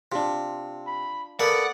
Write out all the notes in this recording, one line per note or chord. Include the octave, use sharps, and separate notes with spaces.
C3 D4 F4
B5
A#3 B3 A4 D5 F#5